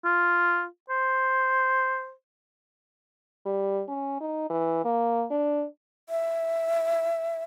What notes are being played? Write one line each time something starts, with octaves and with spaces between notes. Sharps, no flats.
F4
C5
G3
C#4
D#4
E3
A#3
D4
E5